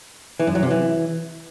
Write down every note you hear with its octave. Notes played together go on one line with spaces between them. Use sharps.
E3
F#2
F#3
C3
E3